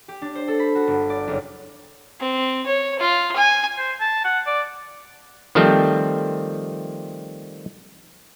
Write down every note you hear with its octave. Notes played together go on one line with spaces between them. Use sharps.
G4
D4
C5
A4
B5
F#4
G1
D5
F#1
C4
C#5
F4
G#5
C5
A5
F#5
D5
D#3 F3 G3 A3 C4